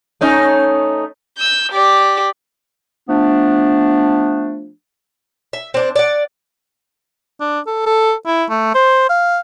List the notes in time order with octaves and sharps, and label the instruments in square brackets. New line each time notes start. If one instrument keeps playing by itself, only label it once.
[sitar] A3 C#4 D#4
[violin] E6 G6
G4 D5
[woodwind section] F3 A3 B3 D4
[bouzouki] E5
C4 D4
D5 F#5
[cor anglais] D4
A4
A4
E4
A3
C5
F5